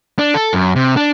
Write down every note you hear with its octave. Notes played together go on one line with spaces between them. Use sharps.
D4
A4
F#2
C3
D4